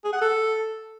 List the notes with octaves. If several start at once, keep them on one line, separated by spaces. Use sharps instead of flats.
G#4
F#5
A4